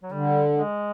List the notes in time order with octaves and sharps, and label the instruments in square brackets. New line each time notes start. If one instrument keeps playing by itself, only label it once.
[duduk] F#3
[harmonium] D3 [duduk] G3
[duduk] G#3